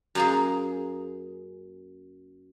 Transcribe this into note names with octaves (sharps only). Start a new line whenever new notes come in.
F#2 A#3 G#4